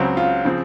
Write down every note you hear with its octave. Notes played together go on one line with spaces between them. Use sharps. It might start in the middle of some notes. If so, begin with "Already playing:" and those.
Already playing: C#2 C#3 F#3 C4
F4
C#3 F3 C4